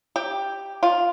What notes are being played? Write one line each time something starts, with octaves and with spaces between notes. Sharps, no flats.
G4
F4